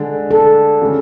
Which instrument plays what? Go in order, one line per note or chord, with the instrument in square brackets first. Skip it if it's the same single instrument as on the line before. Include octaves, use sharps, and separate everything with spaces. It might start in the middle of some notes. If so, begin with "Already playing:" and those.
Already playing: [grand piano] D3 G#3 D4
[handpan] A4
[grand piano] C#3 G#3